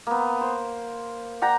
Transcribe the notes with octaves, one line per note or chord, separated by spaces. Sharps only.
A#3 B3
C5
D5 F#5 G5 A#5